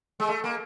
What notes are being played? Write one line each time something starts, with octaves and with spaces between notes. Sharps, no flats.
G#3
A3
A#3